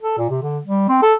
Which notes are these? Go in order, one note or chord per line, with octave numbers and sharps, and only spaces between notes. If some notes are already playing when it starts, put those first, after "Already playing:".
A4
A#2
C3
D3
G3
C4
A4